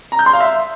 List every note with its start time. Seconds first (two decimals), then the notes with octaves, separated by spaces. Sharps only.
0.12 A#5
0.19 G6
0.26 C6
0.33 F5
0.40 E5